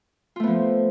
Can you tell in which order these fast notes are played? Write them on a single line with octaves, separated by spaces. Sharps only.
F4 A3 B3 F3